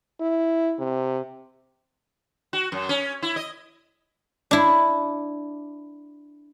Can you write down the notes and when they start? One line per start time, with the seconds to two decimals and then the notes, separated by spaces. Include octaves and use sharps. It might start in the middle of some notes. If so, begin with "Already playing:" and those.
0.21 E4
0.79 C3
2.53 F#4
2.72 F#2
2.89 C#4
3.22 E4
3.36 D#5
4.51 D4 E4